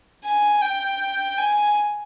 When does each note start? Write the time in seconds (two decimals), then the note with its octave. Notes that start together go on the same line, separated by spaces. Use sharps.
0.25 G#5
0.62 G5
1.38 G#5